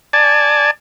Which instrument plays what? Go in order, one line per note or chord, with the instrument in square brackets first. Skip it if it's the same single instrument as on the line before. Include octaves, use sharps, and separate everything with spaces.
[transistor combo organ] D5 G#5 A5